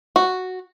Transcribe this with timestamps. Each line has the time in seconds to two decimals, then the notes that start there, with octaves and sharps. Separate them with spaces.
0.16 F#4